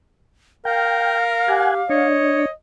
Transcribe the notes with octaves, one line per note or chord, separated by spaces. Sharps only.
A#4 F5 G5
G4 F#5 G#5
D4 C#5 D#5